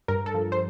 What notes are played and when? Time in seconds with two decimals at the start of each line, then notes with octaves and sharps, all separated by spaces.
0.08 G2 A#4
0.26 A4
0.34 F3
0.52 C5